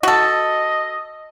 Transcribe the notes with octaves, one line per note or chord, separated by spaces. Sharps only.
F#4 A4 D#5